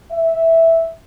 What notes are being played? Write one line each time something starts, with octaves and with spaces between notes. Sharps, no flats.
E5